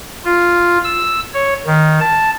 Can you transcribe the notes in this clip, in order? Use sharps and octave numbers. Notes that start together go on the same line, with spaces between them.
F4
E6
C#5
D#3
A5